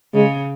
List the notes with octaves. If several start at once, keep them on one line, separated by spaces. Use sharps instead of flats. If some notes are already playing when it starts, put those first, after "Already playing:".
C#3 G#3